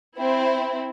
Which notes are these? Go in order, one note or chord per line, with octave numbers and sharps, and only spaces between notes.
C4 E4